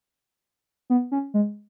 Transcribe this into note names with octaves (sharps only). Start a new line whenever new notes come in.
B3
C#4
G#3